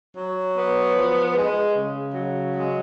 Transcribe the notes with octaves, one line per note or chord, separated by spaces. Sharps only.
F#3
B3
F3
G#3
C#3
F#3
G#3